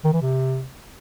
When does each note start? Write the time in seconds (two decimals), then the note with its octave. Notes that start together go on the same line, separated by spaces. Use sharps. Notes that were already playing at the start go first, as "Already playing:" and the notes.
0.04 D#3
0.13 E3
0.22 C3